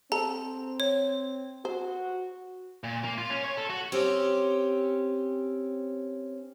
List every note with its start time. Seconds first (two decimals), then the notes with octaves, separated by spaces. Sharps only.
0.12 C4 A4 A#5
0.80 C#5
1.65 F#4 C5
2.84 A#2
3.04 A#3
3.18 F4
3.30 C#4
3.44 C#5
3.57 A4
3.70 F#4
3.92 C4 C#4 G4